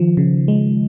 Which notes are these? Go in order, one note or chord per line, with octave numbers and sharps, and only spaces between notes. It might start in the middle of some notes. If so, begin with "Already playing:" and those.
Already playing: D#3 F3
C#3
G#3